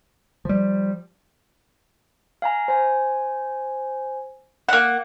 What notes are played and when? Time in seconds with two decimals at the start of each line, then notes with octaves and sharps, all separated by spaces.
0.45 F3 G3
2.42 F5 G#5 A#5
2.68 C5 G#5
4.69 A#3 F#5